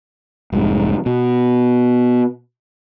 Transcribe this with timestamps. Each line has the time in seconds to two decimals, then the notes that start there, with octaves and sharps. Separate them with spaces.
0.52 F1 C2 G#2
1.06 B2